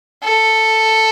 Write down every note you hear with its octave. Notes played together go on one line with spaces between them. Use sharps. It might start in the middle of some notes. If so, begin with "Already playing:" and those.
A4